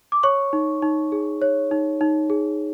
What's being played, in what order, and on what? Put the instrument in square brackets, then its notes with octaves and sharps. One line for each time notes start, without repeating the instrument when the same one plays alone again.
[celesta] D6
C#5 C#6
D#4
D#4
G#4
C#5
D#4
D#4
G#4